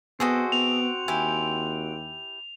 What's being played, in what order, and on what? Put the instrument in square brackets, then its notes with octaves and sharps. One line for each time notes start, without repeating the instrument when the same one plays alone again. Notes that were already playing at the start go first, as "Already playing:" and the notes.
[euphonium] B3 [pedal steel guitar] C4 F#4 [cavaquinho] G#4 A4 D#5
[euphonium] B3 [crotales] F7
[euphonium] D#2 [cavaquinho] E4 G4 G#5